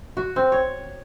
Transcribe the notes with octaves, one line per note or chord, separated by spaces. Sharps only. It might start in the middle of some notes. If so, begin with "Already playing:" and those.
F#4
C4
C#5